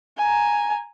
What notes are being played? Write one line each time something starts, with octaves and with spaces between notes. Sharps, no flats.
G#5 A#5